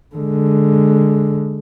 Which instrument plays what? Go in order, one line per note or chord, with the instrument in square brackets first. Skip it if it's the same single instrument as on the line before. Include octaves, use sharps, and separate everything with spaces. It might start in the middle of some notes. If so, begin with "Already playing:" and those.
[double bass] D3 G#3